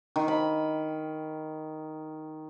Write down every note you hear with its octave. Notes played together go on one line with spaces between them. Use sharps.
D#3
B5